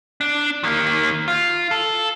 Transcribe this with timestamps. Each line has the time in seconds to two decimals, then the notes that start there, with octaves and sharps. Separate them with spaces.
0.21 D4
0.63 D#3 A#3
1.28 F4
1.71 A4